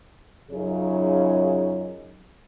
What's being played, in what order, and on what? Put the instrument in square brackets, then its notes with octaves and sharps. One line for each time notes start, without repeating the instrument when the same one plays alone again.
[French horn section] F#2 C#3 D#4 F4 G#4 C#5